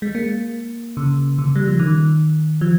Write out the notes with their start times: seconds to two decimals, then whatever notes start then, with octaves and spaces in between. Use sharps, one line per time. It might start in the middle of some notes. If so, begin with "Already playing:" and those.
0.02 G#3
0.15 A#3
0.97 C#3
1.38 C#3
1.56 G3
1.67 F3
1.80 D#3
2.61 F3